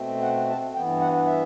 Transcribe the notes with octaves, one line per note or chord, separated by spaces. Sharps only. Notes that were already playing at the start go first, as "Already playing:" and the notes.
Already playing: B2 A3 C4
F#5
A5
G2 E3 B3 G5
F#5
E5